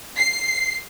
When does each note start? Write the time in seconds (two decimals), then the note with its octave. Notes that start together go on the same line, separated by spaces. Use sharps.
0.18 C7